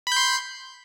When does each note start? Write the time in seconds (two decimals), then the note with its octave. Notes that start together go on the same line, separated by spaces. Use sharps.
0.07 B5
0.12 G6
0.17 C6